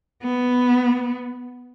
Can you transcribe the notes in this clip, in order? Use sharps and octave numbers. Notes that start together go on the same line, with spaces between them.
B3